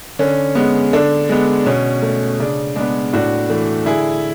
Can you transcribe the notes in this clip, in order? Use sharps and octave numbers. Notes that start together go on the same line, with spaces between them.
D3 C#4
G#3 B3
D3 D4
G#3 B3
B2 C#4
A3
C#3 D4
G#3 B3 D4
A2 D4 F#4
E3 A3
D3 E4 G#4